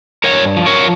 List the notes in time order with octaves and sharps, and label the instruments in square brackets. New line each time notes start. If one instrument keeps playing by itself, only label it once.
[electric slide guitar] G2 A#4 C#5
F3
A#4 C#5